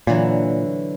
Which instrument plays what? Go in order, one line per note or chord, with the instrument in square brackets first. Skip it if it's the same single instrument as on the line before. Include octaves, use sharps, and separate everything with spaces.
[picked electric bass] A#2 [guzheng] D3 E3 F#3